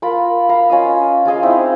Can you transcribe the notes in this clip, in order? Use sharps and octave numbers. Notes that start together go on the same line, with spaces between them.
F4 A#4 B5
F5 A#5 B5
C#4 F4 D#5 D#6
F4 G#4 D#5 F5
C4 D#4 E4